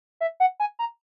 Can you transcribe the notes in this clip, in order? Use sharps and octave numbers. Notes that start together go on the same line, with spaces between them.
E5
F#5
G#5
A#5